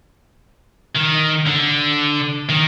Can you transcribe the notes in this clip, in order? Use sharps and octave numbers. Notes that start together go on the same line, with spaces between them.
D#3
D3
D#3